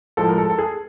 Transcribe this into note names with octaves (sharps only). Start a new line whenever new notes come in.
A2 F3 G#3 A4
A#4
A4
A4
G#4